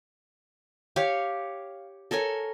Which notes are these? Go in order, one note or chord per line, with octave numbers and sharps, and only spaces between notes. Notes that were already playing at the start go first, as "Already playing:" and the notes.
G4 C#5 F5
A4 A#4 C#5 G#5